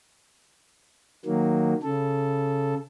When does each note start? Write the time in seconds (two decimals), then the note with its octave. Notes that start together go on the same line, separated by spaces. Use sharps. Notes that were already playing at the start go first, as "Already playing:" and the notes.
1.25 D#3 F#3 A#3
1.83 C#3 A4